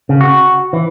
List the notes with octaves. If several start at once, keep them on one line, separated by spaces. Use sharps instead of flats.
C#3
F#4
E3